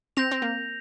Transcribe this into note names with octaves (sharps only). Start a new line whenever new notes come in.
C4 G6 A#6 F7
C4
A#3